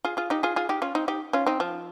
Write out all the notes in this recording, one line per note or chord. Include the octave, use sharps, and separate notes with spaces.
F4 G#4
F4 G#4
D#4 G4
F4 G#4
F4 G#4
D#4 G4
C#4 F4
C4 D#4
D#4 G4
C#4 F4
C4 D#4
F3